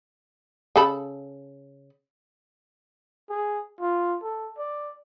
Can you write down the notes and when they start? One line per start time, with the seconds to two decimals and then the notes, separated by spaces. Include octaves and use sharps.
0.76 C#3 A4 B5
3.29 G#4
3.80 F4
4.23 A4
4.57 D5